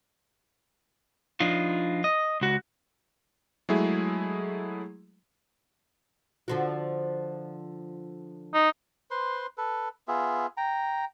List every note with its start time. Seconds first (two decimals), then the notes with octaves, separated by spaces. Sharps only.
1.40 F3 D4 D#4 F4
2.04 D#5
2.41 C#2 F#4
3.69 F#3 G#3 A3 E4 G#4
6.48 D3 F3 F#4
8.54 D#4
9.11 B4 C5 C6
9.58 A4 B4
10.08 B3 F4 G#4 E5
10.57 G5 A#5